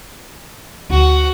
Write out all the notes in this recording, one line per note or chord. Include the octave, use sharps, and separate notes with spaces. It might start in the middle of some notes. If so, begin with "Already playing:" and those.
D2 F#4